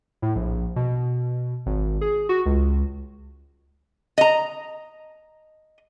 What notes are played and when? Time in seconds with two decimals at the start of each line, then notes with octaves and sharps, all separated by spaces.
0.22 A2
0.35 A#1
0.76 B2
1.66 G#1
2.01 G#4
2.29 F#4
2.46 C#2
4.18 D#5 A#5